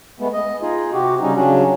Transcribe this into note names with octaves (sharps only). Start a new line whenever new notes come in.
G#3 A3 B3
D#5
D#4 F4 G#4
C3 F#4 G4
C#3 G3 C#4 D#4
C#3 F#3 C#4 D4